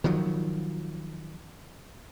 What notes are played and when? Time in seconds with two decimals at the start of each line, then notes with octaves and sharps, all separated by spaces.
0.04 D#3 F3 F#3